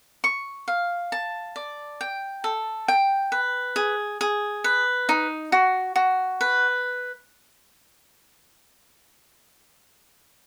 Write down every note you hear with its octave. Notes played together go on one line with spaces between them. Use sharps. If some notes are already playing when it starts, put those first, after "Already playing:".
C#6
F5
A5
D5
G5
A4
G5
B4
G#4
G#4
B4
D#4
F#4
F#4
B4